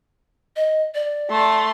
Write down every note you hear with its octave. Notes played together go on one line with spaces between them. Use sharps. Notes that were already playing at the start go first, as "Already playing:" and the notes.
D#5
D5
A3 C6